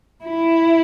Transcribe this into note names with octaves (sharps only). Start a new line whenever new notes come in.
E4